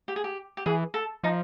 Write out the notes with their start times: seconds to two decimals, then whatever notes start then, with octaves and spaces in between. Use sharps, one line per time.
0.08 G4
0.16 G#4
0.24 G4
0.57 G4
0.66 E3 G#4
0.94 A4
1.23 F3 D#4